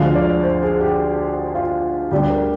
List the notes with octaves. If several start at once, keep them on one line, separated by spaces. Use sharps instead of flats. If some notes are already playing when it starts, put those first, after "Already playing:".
Already playing: D2 D3 F3 G#3 F5
D5
C5
G#4
G4
F4
D2 D3 G3 G4
A#4